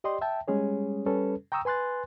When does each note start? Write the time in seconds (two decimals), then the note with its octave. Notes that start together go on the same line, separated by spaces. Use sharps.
0.04 G4 D5 D#5 G5 C6
0.21 E5 G5 A5
0.48 G3 G#3 C#4 G#4 C#5
1.06 G3 C#4 A4 B4
1.52 G5 A#5 C#6 D#6 E6
1.65 B4 G#5 C6 F#6 A6